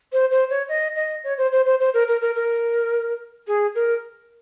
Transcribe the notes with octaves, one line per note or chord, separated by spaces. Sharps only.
C5
C5
C#5
D#5
D#5
C#5
C5
C5
C5
C5
A#4
A#4
A#4
A#4
G#4
A#4